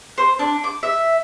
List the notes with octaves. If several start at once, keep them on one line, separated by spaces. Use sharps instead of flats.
C5
D4
D6
E5